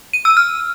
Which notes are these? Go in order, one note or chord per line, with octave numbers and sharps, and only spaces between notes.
D#7
E6
F6